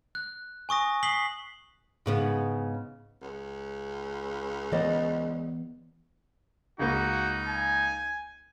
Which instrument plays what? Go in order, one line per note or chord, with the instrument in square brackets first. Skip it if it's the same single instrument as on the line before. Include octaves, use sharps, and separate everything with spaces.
[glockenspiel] F#6
G#5 C#6 D#6 A#6
D#6 B6 C7 F#7 G7
[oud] G#2 C#3 B3
[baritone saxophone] C#2
[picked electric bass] E3 B3 [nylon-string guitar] C5 D5 D#5
[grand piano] C#2 A#3 [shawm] D#4 [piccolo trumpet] F#4
[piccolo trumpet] G#5